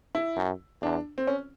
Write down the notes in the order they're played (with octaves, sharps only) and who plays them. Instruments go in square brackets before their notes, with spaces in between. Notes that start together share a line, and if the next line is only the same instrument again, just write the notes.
[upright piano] E4
[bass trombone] F#2
[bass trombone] E2 [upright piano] D4
[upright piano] C4
C#4